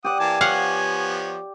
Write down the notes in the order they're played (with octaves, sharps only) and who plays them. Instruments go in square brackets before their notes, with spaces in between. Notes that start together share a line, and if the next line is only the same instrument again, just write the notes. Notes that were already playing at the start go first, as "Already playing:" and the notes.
[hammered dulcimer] G4 D5 [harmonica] F#5 [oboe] D#6
[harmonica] E3 A#3 A5 [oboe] G#5
[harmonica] F3 B3 C#5 [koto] F5 F#5